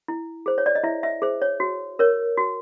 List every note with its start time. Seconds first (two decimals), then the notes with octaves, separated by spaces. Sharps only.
0.08 E4
0.46 G#4 C5
0.58 C#5
0.66 D5
0.75 D#5
0.84 E4 E5
1.03 E5
1.22 G#4 C5
1.42 C#5
1.60 F#4
1.99 A#4 C#5
2.37 F#4